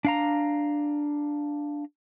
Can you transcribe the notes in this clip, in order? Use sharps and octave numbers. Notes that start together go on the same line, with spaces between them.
D4 F5 A#5